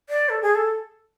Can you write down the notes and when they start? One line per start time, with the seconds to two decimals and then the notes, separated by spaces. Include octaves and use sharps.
0.09 D5
0.29 A4
0.42 G#4
0.55 A4